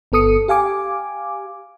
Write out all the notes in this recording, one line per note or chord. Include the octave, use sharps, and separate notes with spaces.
G1 B3 A4 D#6 C#7
G4 F5 G#5 D6